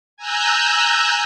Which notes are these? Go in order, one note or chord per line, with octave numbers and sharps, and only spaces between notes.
G#5 A#5 E6 F#6 G6